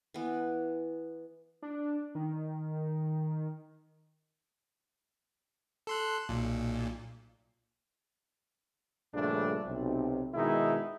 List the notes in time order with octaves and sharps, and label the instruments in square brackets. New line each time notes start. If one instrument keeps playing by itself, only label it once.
[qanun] E3 B3
[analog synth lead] D4
D#3
[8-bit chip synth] A4 C6 F#6
B1 A#2
[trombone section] A#1 G2 C#3 A3 D4
B1 C3
B2 D#3 G#3 D#4 E4